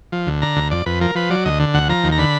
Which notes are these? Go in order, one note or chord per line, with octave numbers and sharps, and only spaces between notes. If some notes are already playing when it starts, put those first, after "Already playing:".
F3
D2
D3 A#5
D2
F2 D5
F2 B4
F3 A#4
F3 B4
F#3 D5
D2 D#5
D3
D2 F#5
F3 A#5
D#2
A#5
D3 B5